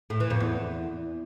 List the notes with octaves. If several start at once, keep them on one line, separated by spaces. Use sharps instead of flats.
A2
E3
F2
E2